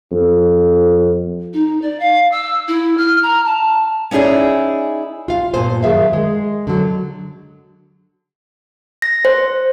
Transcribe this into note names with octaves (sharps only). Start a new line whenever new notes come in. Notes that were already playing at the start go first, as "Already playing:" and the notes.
F2
D#4
D5
F5
E6
E4
F6
A#5
A5
C#4 D#4 E4 G#4 D5
F4 F5
G2 A#2 B3 C5 G#5
D#3 F#3 G#4 E5 F5
G#3
D3 F#3
A#6
C5